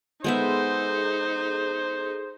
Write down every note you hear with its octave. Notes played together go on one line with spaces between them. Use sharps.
G#3 B3 D#4 G#4 A4 C5 E5